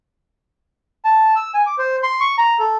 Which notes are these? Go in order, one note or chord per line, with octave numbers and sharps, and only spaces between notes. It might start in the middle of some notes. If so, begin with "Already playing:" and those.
A5
E6
G#5
D6
C5
C6
C#6
A#5
A4